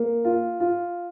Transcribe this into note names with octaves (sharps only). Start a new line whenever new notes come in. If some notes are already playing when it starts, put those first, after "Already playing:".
Already playing: A#3
F4
F4